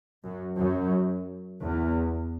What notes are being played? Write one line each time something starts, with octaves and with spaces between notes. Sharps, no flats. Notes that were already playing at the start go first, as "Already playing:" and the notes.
F#2
F#2
E2